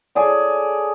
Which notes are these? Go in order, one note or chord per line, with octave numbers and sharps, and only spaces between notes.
G#4 A4 C#5 D5